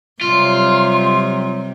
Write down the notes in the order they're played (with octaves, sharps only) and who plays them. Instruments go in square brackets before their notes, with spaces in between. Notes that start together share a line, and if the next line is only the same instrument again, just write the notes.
[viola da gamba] C3 G3 [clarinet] F#3 [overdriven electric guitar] F4 [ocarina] C6